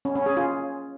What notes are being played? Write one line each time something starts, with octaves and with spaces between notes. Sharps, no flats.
C#4
C#4
G#4
F4